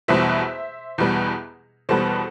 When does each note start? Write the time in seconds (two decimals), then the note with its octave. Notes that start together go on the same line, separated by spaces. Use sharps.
0.08 E2 B2 G3 B3 C5 E5
0.98 E2 B2 G3 B3
1.89 E2 B2 G3 B3 A4 C5